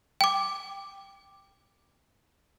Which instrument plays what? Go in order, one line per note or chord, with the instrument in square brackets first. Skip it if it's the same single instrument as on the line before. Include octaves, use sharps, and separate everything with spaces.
[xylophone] G5 D6